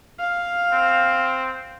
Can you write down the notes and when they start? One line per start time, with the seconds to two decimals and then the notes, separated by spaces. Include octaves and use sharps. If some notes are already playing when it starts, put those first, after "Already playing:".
0.19 F5
0.73 C4